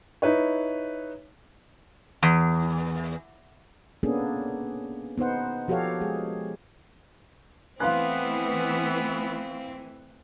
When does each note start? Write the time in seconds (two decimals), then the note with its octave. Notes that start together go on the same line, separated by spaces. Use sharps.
0.22 D#4 E4 B4 C#5
2.23 E2
4.03 A#3 B3 C#4 D4 G#4 A4
5.18 B3 D#4 C5 F#5
5.68 F3 F#4 G4 A4 C#5 F5
6.01 G#3 G#4
7.80 E3 A3 B3 C4 E4 F5 C6 F#6